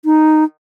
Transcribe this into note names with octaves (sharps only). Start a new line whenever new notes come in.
D#4